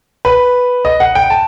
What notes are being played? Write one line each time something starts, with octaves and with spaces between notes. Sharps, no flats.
B4
D#5
F#5
G5
A5